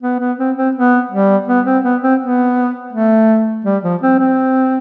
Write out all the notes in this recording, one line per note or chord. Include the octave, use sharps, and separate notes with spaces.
B3
B3
C4
C4
B3
G3
B3
C4
B3
C4
B3
A3
G3
F3
C4
C4